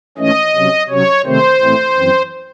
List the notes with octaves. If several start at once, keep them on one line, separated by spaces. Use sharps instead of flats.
G#2 E3 A3 C#4 D#5
C3 F#3 C#4
C3 F#3 C#4 C#5
C3 D#3 A3 C4 C5
A2 E3 A3 C4
F#2 E3 C4